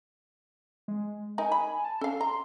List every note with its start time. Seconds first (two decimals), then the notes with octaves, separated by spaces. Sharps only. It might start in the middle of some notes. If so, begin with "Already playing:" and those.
0.88 G#3
1.38 D#4 A#4 G#5
1.52 B5
1.85 A5
2.01 C#4 A4 F5
2.21 A#5 C6